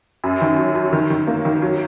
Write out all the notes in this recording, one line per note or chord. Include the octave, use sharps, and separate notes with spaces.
F#2
D#3
F#3
F#3
D#3
D#3
A#3
D#3
F#3